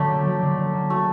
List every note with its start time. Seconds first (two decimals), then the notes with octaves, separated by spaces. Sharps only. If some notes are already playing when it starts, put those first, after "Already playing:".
Already playing: D3 F#3 A3 G4
0.10 A#3
0.26 F#3
0.42 D3
0.58 D3
0.73 A#3
0.90 A3 F#4